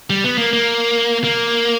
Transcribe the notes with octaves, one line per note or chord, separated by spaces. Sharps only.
G3
B3
A#3
A#3
A#3